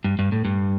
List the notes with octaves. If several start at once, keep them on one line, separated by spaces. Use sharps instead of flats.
G2
G2
A2
G2